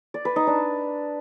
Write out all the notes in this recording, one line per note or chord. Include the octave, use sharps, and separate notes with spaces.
D5
B4
D#4
D4